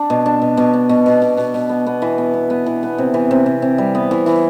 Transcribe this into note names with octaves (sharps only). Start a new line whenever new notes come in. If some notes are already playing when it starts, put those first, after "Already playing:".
Already playing: D4
B2
D4
B2
B2
D4
B2
B2
B2
B2
B2
B3
B3
E3
B3
B3
B3
E3
B3
C3
E3
C3
C3
C3
G3
B3
E3
E3